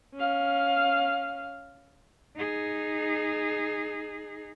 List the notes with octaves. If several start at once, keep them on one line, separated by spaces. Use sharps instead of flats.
C#4 F5
D#4 G#4